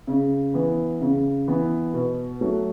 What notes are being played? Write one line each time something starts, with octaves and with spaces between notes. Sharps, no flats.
C#3
E3 B3
C#3
E3 B3
B2
F#3 A3